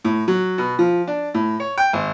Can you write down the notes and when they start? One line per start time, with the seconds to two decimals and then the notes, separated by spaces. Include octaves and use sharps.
0.05 A2
0.28 F#3
0.58 B2
0.79 F3
1.07 D4
1.34 A2
1.60 C#5
1.78 G5
1.93 G#1